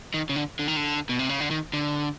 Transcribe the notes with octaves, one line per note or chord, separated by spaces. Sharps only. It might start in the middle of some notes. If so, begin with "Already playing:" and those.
D#3
C#3
D3
D3
D#3
D3
B2
C3
C#3
D3
D#3
D3